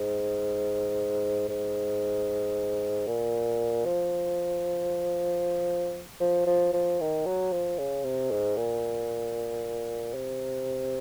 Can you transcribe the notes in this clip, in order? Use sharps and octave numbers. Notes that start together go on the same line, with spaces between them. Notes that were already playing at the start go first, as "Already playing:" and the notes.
Already playing: G#2
G#2
A#2
F3
F3
F3
F3
D#3
F#3
F3
C#3
C3
G#2
A#2
C3